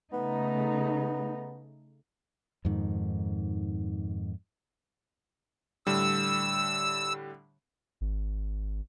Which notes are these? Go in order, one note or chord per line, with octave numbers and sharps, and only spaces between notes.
C#3 A3 B3 D#4
F2 G#2 D#3
A2 D3 G3 E6
G#1